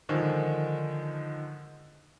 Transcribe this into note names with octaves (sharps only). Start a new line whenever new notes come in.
D3 D#3 F3 G#3